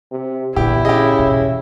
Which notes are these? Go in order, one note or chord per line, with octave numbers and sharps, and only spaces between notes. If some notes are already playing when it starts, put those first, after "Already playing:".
C3
E2 A#2 D3 E4 G4
C#3 G4 D#5
E2 B2